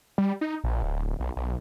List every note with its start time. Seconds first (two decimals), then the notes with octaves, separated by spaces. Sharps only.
0.18 G3
0.41 D#4
0.64 A#1
0.83 D1
1.20 B1
1.37 B1